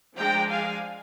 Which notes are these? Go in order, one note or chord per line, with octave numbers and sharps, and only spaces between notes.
F3 G#3 D4 G5 A#5
F5 G#5